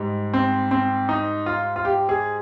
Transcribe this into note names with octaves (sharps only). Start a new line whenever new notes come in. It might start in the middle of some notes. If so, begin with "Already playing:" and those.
Already playing: G#2 G3
C4
C4
D#4
F4
F4
G4
G#4